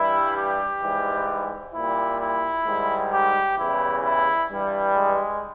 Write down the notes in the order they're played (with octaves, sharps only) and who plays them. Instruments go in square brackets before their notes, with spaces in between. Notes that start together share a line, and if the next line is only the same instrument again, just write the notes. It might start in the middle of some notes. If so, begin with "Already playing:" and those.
Already playing: [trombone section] G2 E3 G3 E4
G4
G#2 E3 G3
A#2 G3 E4
E4
G#2 D#3 G3
G4
E2 C#3 E3 G3 E4
E4
G2 E3 G3
G#3